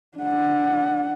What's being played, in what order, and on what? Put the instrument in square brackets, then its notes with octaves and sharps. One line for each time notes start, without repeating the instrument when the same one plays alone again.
[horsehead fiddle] D4 F#5